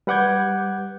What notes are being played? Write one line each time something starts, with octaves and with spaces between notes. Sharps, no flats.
G3 B4 F#5 D6 G6 G#6